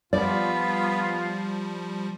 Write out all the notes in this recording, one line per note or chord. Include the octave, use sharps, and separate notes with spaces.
F3 G3 B3 F4 D5